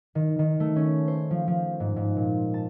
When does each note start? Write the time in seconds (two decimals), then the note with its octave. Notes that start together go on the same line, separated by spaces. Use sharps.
0.15 D#3
0.39 D#3
0.60 A3
0.76 C#4
1.08 C5
1.31 F3
1.48 F3
1.80 G#2
1.96 G#2
2.16 A#2
2.54 A5